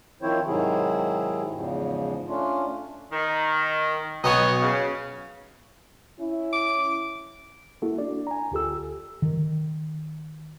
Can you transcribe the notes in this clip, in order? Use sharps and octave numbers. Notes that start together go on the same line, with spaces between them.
D#3 F3 C4 E4 C5 C#5
G#2 C3 D#3 F#3 E4 G#4
E2 G#2 C#3 F3
A3 C#4 D4 F4
D#3
B1 B2 B3 C#5 D#5 D#6
C#3
C#4 E4
D6
A#3 E4 F#4 A4
D4 D5
G#5 A#5
D2 F4 G4 A4 E6
D#3